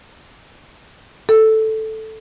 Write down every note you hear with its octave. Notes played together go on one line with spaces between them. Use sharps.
A4